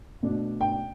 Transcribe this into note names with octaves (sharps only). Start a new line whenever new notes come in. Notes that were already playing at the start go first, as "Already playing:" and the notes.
B2 A3 D4
G5